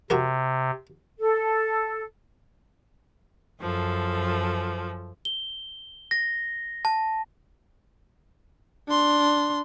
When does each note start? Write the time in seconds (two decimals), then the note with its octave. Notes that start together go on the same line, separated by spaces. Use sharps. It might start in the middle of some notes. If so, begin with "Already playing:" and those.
0.10 C3 F#4 G4 A#4
1.19 A4
3.59 F#2 F3 A4
5.25 G7
6.11 A#6
6.85 A5
8.88 D4 C6